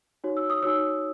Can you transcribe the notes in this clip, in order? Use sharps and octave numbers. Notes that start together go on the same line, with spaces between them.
D#4 F#4 C#5
E6
D#6
D#4 F#4 C#5 E6